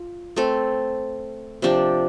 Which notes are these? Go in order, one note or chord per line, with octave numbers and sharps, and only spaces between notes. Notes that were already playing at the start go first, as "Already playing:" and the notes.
Already playing: F4
A3 C4 A4
C3 F3 D4 G4